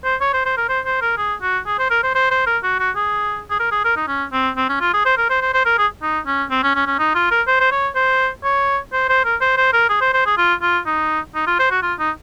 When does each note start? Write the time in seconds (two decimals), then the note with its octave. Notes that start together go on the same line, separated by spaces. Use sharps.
0.04 C5
0.21 C#5
0.34 C5
0.46 C5
0.57 A#4
0.69 C5
0.86 C5
1.01 A#4
1.18 G#4
1.42 F#4
1.66 G#4
1.79 C5
1.90 A#4
2.03 C5
2.15 C5
2.31 C5
2.47 A#4
2.63 F#4
2.79 F#4
2.96 G#4
3.50 G#4
3.60 A#4
3.72 G#4
3.85 A#4
3.97 D#4
4.08 C#4
4.33 C4
4.57 C4
4.69 C#4
4.81 F4
4.93 G#4
5.06 C5
5.17 A#4
5.30 C5
5.42 C5
5.54 C5
5.65 A#4
5.78 G#4
6.02 D#4
6.27 C#4
6.51 C4
6.63 C#4
6.75 C#4
6.86 C#4
6.99 D#4
7.15 F4
7.31 A#4
7.47 C5
7.60 C5
7.71 C#5
7.95 C5
8.44 C#5
8.93 C5
9.09 C5
9.25 A#4
9.41 C5
9.57 C5
9.73 A#4
9.89 G#4
10.01 C5
10.14 C5
10.26 G#4
10.37 F4
10.62 F4
10.86 D#4
11.35 D#4
11.47 F4
11.59 C5
11.71 F#4
11.82 F4
11.99 D#4